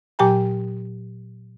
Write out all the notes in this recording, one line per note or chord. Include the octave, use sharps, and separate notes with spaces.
A#2 F#3 G4 G5 G#5 A#5